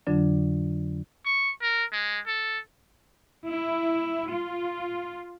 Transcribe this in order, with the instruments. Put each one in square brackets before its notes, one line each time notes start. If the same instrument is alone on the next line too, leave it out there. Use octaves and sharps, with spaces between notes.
[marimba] F2 D3 F#3 D4
[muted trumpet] C#6
A#4
G#3
A4
[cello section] E4
F4